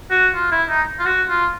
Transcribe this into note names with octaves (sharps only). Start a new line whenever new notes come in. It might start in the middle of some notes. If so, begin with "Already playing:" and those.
F#4
F4
E4
D#4
F4
F#4
F4